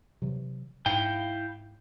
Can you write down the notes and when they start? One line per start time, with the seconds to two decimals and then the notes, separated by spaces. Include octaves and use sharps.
0.22 C3 E3 F#3
0.86 G#2 E4 F5 G5